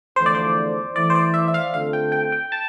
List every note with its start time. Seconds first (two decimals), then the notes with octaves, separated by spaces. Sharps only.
0.16 E2 D3 F3 A3 C5
0.26 D5
0.34 C5
0.95 E3 A3 E4 D5
1.10 C5
1.15 D5
1.34 E5
1.48 E5
1.54 F5
1.73 D3 A3 C4 F4 A4 F5
1.93 G5
2.12 G5
2.32 G5
2.52 A5